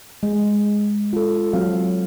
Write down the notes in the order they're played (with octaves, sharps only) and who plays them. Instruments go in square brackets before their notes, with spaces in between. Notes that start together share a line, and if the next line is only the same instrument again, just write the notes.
[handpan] G#3
F4 A4
F#3 C4 F5